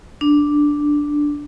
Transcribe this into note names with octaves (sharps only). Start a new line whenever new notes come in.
D4